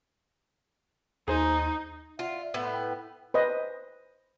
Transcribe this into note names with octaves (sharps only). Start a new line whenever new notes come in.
D#2 D#4 G#4 C5 A#5
F4 D5 E5 F#5
A2 B3 E5 C6
B4 G5 B5
B4 C5 D#5